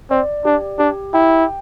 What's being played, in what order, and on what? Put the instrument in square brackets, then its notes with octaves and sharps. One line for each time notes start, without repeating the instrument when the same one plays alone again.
[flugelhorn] C4 [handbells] D5
[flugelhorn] D4 [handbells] G4
[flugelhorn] D4 [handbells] G4
[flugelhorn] E4 [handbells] G5